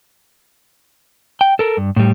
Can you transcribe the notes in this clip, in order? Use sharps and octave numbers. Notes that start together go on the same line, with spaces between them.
G5
A4 A#4
G2
A2 G3